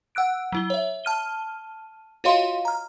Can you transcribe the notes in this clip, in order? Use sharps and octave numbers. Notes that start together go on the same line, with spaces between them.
F#5 E6 F#6 D7
F#3 E4 G7
C#5 E5
A5 F6 D#7 G7
F4 F#4 C#5 D#5 F5 C6
A#5 F6